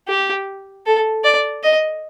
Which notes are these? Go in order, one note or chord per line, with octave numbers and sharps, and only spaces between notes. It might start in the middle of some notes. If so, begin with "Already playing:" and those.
G4
A4
D5
D#5